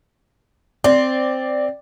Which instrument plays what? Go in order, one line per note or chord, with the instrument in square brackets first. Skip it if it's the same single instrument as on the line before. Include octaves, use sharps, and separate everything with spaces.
[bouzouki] C4 [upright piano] D5